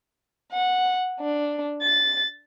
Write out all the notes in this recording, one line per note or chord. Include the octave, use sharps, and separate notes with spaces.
F#5
D4
A6